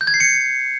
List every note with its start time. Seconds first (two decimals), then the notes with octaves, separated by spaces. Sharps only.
0.01 G6
0.07 G#6
0.14 C7
0.20 C#7